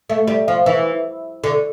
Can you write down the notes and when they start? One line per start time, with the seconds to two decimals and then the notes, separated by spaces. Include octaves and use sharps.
0.10 A3
0.28 G3
0.48 F3
0.66 E3
1.44 D3